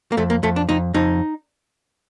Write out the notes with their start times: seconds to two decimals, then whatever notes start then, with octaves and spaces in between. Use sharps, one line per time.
0.12 A#3
0.17 F2 A3
0.30 A#3
0.43 F2 A3
0.56 D4
0.69 F2 D#4
0.94 F2 D#4